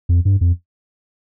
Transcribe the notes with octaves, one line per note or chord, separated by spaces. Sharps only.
F2
G2
F2